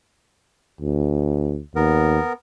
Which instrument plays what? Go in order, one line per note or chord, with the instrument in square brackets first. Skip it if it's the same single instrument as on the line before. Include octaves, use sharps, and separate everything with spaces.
[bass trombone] D2
[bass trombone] D#2 [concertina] B3 A#4